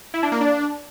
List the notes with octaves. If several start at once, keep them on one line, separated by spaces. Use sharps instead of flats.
E4
D4
A#3
D4